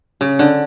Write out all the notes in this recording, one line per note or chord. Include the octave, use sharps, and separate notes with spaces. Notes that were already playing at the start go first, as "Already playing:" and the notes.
C#3
D3